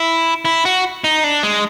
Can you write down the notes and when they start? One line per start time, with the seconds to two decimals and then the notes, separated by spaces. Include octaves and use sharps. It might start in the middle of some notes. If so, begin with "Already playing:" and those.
Already playing: E4
0.45 E4
0.65 F#4
1.04 D#4
1.24 D4
1.43 G#3